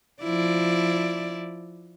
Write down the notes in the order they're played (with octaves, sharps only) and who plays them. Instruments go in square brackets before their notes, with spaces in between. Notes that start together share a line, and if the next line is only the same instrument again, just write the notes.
[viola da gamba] F3 E4 D5